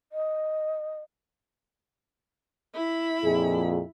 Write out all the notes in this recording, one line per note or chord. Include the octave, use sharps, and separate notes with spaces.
D#5
E4 B5
F2 A#2 G#4